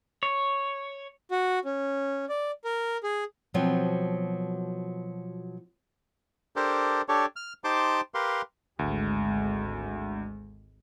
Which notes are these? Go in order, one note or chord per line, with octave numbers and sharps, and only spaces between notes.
C#5
F#4
C#4
D5
A#4
G#4
B2 F3 F#3 B3 C4
D4 G4 A4 A#4 C5
D4 G4 A4 C#5
F6
D#4 G4 C5 A5 C6 D6
G4 A#4 B4 F5 C6
G#1 D2 G#3